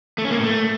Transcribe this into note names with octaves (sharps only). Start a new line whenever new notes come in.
A3
C#4
A#3
A2
A3